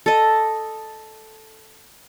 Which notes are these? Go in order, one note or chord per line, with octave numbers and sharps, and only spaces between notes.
A4 D#5